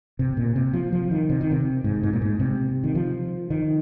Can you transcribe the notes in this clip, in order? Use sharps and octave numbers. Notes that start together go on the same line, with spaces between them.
C3
A#2
C3
F3
F3
D#3
C3
D#3
C3
G#2
G#2
A#2
G#2
C3
D#3
F3
D#3